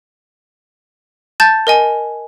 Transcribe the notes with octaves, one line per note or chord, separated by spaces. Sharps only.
A5 G6 A6
A#4 D#5 G#5